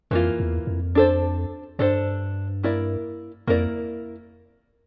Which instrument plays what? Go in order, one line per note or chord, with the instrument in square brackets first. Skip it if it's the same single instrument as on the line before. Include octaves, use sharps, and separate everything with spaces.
[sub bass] F2 [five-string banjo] E3 A#3 F4
[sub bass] E2
F2
[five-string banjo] D4 A4 C5
[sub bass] G2 [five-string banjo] D4 A4 C5
[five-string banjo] A#3 E4 A#4 D5
[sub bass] F2 [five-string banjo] A#3 E4 A#4 D5